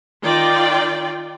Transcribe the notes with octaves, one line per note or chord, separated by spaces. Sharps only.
D#3 F4 D5 G5